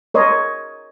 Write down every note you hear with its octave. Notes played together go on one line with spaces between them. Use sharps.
A#4 C#5 D#5 C6